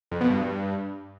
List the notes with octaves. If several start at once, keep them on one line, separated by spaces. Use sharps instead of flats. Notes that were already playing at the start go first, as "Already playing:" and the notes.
F2
B2
G2